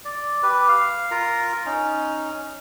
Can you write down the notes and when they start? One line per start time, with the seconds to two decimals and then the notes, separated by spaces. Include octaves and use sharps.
0.05 D5
0.43 G4 B4
0.68 F5
1.11 F4 A#4 A#5
1.66 C#4 D#4